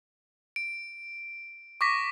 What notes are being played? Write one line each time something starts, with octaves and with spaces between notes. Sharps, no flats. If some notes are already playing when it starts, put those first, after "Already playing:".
D7
C#6 D6 A#6 B6